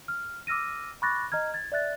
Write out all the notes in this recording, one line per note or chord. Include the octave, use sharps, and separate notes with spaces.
F6
D6 E6 F6 A#6 D#7
B5 C#6 D6 F#6 A6 A#6
D#5 A#5 F6 G#6
G#6 A6
D5 E5 F#6 A6